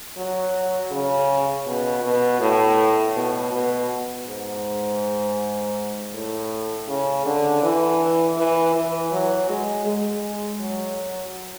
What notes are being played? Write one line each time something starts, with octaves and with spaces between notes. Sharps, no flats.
F#3
C#3
B2
B2
A2
B2
B2
G#2
A2
C#3
D3
E3
E3
E3
F#3
G#3
G#3
F#3